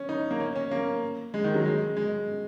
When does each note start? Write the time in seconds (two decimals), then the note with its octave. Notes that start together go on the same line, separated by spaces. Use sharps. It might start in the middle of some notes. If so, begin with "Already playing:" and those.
Already playing: C#4
0.09 D#4
0.31 A#3
0.40 C#4
0.56 C#4
0.71 A#3
1.34 G#3
1.44 D#3
1.54 F#3
1.65 G#3
1.97 G#3